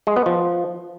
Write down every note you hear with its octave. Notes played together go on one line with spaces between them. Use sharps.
G#3
B3
F3